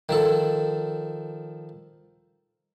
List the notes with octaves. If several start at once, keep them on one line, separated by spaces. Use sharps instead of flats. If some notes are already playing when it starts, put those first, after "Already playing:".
D#3 F3 A4